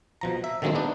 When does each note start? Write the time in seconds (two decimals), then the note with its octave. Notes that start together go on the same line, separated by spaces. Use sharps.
0.21 B2 F3 A#5
0.44 E5
0.62 D3 D#3 F#3 G#3 A#3 C4
0.75 B3 D4 D#4